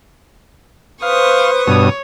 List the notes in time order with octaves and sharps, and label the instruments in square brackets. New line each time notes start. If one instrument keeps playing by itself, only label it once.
[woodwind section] B4 [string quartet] C5 C#6 D#6 [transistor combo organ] F5
[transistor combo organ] G2 B2 D#6 [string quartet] C#5